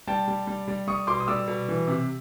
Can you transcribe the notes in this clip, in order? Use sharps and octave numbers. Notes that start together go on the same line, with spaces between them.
G3 G5 A5
G3
G3
G3
G3 C#6 D#6
B2 C6 D6
D#6
G3 D6 E6
B2
E3
C3